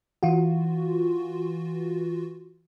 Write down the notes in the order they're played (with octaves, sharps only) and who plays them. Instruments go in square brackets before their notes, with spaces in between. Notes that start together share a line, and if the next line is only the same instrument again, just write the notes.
[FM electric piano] E3 F4 F#4